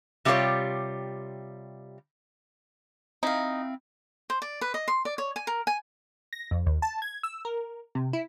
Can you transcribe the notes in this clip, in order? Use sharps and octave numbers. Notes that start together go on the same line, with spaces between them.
C3 G3 C#4 F4 G4 C#5
C4 D#4 E4 F5
C5
D5
B4
D#5
C6
D5
C#5
G#5
A#4
G#5
A#6
F2
D#2
A5
G#6
E6
A#4
C3
E4